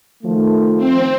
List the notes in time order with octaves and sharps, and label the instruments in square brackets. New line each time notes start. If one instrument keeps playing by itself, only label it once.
[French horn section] D#3 F3 A3
[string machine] C4